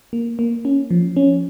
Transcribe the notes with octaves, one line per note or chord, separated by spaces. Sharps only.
A#3
A#3
C#4
F3
C#4